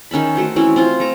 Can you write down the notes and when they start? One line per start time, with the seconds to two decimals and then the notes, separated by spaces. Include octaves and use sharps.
0.11 D#3 C#4 E5 B5
0.35 A3 F#4 C5
0.56 E3 C4 C#4 E4
0.76 C4 F4 C5
1.00 A3 A#5